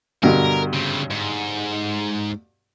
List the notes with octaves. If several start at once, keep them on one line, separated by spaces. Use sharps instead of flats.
G2 B2 D3 A#4
C#3 C4
G#2